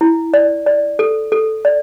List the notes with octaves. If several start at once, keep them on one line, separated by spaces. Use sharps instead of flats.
E4
D5
D5
A4
A4
D5